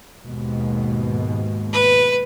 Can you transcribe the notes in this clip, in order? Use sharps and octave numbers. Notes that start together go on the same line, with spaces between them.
D#2 G#2 B2
B4